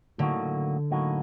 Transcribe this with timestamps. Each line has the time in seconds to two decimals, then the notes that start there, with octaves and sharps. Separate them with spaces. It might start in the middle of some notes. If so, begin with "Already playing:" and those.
0.18 A2 D3 F#3 A#3 D#4 F#4
0.91 A2 F#3 A#3 D#4 F#4